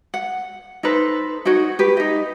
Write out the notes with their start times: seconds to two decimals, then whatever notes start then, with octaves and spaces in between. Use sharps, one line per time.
0.14 F#5
0.83 D#4 A4 B4 C5
1.45 D#4 F#4 C#5
1.79 G4 B4
1.97 D#4 D#5